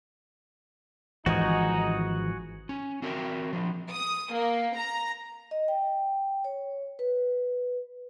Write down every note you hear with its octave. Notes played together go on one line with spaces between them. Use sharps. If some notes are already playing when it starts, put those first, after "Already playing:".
G#1 E3 F3 D#4 F#4 G#4
C#4
C4 F#4 A#4 B4 E5 G5
F3 D4
D#6
A#3
A#5
D#5
G5
C#5
B4